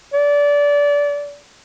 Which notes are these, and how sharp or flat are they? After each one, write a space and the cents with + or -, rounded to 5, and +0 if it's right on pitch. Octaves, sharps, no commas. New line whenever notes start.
D5 -25